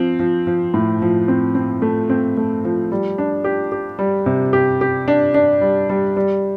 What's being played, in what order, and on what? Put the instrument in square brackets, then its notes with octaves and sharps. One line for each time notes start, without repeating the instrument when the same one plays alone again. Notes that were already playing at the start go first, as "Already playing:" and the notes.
Already playing: [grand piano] F3 C4
F3
F3
A2
F3
C4
C4
A3
C4
A3
F3
G3
D4
G4
G4
G3
C3
G4
G4
D4
D4
G3
G3
G3